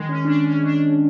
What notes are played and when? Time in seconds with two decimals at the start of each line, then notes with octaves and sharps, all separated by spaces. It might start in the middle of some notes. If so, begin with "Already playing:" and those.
Already playing: D#3 G#3
0.09 C#4
0.25 D4
0.44 C#4
0.64 D4